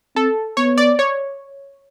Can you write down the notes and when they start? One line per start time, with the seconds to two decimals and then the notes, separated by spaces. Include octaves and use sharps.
0.16 C4 A4
0.57 B3 C#5
0.78 D5
0.99 C#5